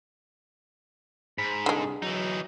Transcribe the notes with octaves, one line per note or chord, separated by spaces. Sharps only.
G#2 B5
C2 D3 G#3 G#4
E3 F#3 D#4